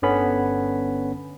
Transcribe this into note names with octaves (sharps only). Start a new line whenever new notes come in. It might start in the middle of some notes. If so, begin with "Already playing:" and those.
G1 D3 B3 C#4 B5